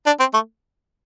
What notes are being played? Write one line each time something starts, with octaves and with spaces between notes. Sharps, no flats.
D4
C4
A3